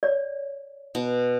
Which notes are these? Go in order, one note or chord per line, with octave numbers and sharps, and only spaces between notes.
C#5 D5
B2